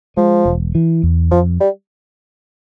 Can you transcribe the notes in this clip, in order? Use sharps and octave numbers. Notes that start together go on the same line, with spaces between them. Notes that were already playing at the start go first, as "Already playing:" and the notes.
F3 G#3
E1
E3
E2
F2 F3
G3